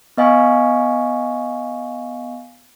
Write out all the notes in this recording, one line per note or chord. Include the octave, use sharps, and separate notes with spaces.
B3 D#5 F5 G#5 C#6